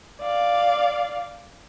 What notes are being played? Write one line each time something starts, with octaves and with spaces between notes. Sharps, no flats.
D5 F5